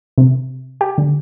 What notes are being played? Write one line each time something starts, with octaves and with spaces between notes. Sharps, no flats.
C3
G4
D3